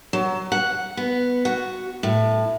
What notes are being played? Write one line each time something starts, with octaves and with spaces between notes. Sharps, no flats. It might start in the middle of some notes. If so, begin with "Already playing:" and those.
F#3
F#5
B3
F#4
A2